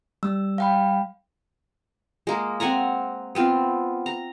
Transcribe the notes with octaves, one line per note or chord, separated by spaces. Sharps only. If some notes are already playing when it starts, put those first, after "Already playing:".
G3 E6
F5 G5 B5
G#3 A#3
C4 F#5 G#5 A#5
B3 C4 F4
A#5